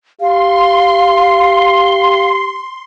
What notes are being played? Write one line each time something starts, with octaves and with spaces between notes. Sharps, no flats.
G4 F5 C6